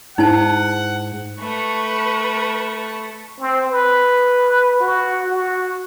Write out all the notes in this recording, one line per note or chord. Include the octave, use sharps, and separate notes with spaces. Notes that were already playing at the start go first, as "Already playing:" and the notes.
G#2 D#4 E4 F#5 A5
A3 B4 C#6
C4
B4
F#4
F#4